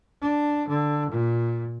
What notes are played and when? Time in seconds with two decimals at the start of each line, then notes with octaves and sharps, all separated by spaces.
0.21 D4
0.68 D3
1.10 A#2